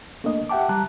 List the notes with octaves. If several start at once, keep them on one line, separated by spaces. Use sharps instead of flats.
A3 A#3 D4 D#5
G4 E5 F#5 G5 A5 D6
G3 A5 A#5 F#6